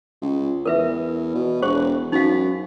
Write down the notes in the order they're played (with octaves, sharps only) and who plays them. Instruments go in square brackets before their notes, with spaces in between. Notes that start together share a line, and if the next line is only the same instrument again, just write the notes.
[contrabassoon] C#2
[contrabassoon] E2 [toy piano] A#4 B4 E5
[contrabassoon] B2
[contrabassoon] E1 [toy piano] G#4 C5 C#6
[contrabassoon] F#2 [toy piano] D#4 F5